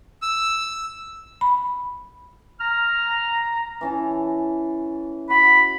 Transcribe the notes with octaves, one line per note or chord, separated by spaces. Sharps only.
E6
B5
A#5 F6
E3 C#4 A5
F#4 B5